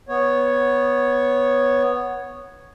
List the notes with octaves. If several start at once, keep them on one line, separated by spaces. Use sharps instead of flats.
B3 C#5